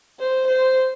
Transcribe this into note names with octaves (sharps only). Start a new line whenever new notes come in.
C5
C5